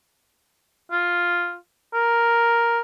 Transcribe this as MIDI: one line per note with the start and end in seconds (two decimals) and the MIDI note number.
0.92 1.56 65
1.94 2.80 70